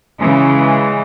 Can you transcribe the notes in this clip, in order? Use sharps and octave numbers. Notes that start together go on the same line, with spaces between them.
C#3 E3 G#3